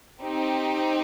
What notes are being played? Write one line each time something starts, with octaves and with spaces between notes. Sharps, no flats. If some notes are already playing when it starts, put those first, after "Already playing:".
C4 D#4 G4